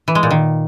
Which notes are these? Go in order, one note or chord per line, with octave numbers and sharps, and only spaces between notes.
E3
G#3
A#2
D#3